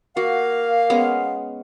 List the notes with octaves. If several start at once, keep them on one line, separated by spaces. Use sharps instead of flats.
A#3 F#4 F5
G#3 B3 C#4